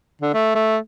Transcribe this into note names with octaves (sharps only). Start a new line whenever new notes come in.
D3
A3
A3